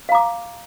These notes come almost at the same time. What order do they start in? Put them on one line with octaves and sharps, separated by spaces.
F5 A#5 D6